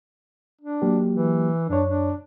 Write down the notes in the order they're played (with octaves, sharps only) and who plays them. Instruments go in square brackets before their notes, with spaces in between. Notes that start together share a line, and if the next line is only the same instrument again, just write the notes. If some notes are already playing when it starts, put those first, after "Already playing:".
[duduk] D4
[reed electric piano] F#3 A#3 G4
[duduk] E3
[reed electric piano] F#2 C#5 [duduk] D4
[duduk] D4